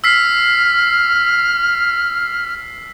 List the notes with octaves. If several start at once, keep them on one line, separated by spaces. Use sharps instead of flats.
E6 F6 B6 C7